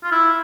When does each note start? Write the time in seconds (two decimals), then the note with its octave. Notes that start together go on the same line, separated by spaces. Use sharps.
0.04 F4
0.12 E4